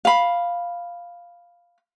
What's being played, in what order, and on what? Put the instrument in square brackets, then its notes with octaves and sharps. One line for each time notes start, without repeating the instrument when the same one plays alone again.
[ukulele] F5 B5